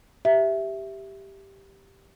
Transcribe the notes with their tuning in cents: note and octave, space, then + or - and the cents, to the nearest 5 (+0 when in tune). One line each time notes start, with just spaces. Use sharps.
G4 +0 E5 +0